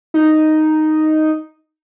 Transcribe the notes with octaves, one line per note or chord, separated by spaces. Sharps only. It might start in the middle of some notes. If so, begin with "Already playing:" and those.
D#4